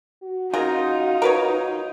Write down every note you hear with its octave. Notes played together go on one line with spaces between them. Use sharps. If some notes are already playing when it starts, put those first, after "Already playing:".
F#4
C#3 D#4 F4 A#4
A#4 B4 C#5